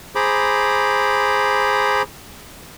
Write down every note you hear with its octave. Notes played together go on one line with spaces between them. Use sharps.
G#4 C5 A#5 B5 D6